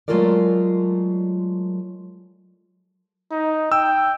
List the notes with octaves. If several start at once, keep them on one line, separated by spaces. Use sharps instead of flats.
F#3 G#3 A3 F4 A#4 D5
D#4
G5 E6